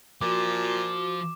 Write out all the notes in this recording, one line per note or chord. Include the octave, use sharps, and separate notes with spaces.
A#2 F3 F#4 D6